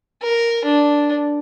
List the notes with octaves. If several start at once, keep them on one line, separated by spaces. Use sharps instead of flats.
A#4
D4